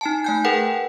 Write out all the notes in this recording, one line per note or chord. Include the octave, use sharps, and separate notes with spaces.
D#4 G#5 A5
A3 G#5 G6
G#4 A#4 B4 F#5 G5